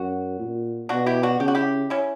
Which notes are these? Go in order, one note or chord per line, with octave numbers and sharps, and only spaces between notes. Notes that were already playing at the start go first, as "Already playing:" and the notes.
Already playing: F#2 F#4
A#2
B2 D4 F#4
E4 G4
D4 F#4
C#3 G4
F#4
E4 G4
C#4 E4